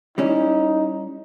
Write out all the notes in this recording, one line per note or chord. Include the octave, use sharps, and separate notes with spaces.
G3 C#4 D#4 E4